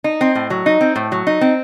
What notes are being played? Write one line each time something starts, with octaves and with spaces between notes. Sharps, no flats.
D#4
C4
A2
F#3
D#4
C4
A2
F#3
D#4
C4